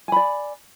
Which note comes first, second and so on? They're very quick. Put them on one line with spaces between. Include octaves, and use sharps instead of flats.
G#5 B5 D5